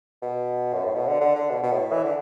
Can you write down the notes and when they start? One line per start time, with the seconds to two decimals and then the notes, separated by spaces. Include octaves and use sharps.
0.22 B2
0.73 F#2
0.84 A2
0.95 B2
1.07 D3
1.21 D3
1.35 D3
1.50 B2
1.63 B2
1.72 A2
1.92 E3
2.03 D3